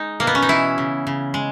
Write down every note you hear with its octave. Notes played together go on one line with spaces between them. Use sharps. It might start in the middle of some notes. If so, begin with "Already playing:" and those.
Already playing: G#3 D#4
B2 A#3
B3
C#4
D#4
E3 E4
C#3
C#3
G#3